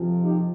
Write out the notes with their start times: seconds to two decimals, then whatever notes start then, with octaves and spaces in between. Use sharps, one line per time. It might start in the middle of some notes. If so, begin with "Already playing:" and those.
Already playing: F2 C3 F3
0.22 D#4 G4